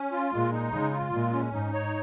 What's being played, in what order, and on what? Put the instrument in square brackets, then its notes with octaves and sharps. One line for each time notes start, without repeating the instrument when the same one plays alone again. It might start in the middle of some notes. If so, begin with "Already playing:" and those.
Already playing: [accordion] C#4
F4
[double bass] A#2 [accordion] G#3
[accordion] D#4
[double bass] C#3 [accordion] G#3
[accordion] F4
[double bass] A#2 [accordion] G#3
[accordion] C#4
[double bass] G#2 [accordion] D#4
[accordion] C#5